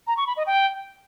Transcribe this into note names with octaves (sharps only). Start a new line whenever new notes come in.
A#5
C#6
B5
D#5
G5